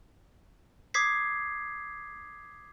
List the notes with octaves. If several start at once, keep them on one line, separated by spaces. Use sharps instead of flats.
D6 D#6 G#6 B6 C7